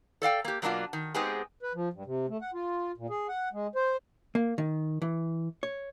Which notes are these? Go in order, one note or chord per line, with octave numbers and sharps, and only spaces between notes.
A4 D5 F5 G5
A#3 G4
B2 F#3 A#3 D4 F4 F#4
D#3
G#3 B3 C4 D#4 G4 G#4
B4
F3
G2
C3
A3
F#5
F4
A#2
G#4
F#5
G#3
C5
A#3
D#3
E3
C#5